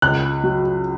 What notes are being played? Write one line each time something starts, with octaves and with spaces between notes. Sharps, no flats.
C#2 F#6
F#3